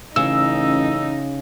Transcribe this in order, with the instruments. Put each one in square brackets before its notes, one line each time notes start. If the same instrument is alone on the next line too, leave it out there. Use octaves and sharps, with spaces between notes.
[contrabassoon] A1 [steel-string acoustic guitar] C#3 [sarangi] D#4 [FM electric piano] E6